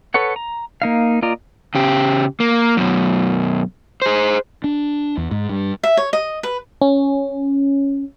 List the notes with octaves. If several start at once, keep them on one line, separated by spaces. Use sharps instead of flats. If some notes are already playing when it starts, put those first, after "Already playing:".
A4 B4 C#5 F#5
A#5
A#3 D#4 F5
A#3 F4 D5 D#5 A#5
C#3 G4
A#3
F#2 B2
G#4 C5
D4
E2
G#2
G2
E5
C#5
D#5
B4
C#4